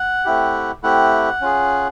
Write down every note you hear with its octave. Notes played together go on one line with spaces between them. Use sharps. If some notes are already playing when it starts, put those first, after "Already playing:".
Already playing: F#5
A3 C4 E4 G4
A3 C4 E4 G4 F#5
C#4 F4 G#4